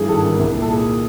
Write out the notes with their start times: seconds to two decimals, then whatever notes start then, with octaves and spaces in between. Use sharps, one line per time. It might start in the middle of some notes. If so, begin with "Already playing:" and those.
Already playing: G2 E3 D4 G#4
0.09 G#1 A4
0.24 G#1
0.39 C2
0.55 A#2
0.62 A4
0.70 A#2 G#4